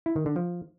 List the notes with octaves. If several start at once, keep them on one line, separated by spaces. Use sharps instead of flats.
E4
D#3
D3
F3